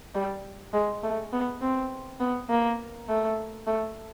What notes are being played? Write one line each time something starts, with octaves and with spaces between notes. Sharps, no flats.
G3
G#3
A3
B3
C4
B3
A#3
A3
A3